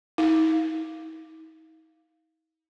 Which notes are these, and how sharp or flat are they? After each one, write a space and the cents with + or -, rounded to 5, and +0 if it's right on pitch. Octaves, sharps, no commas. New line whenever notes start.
D#4 +45 F5 +0